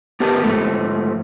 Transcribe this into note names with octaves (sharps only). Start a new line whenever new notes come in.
B3 G4 A#4 B4 A5
G#2 F3 A3